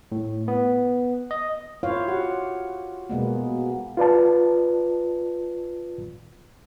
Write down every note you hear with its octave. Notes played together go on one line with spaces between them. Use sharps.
A2
B3
D#5
E4 F4 C5 C#5 F5
F#4 G4 F#5
B2 G#3 A#3 B3
F4 B4 D5 A5